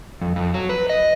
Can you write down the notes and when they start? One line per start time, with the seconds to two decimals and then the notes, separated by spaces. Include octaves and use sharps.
0.21 F2
0.36 F2
0.54 F#3
0.69 B4
0.89 D#5